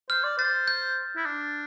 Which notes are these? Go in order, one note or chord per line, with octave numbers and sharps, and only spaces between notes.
C5 F6
D5
C5 A6
G6
E4
D4